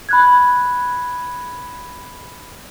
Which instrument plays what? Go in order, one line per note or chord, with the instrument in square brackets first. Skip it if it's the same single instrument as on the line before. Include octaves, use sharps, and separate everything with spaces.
[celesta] B5 F#6 G#6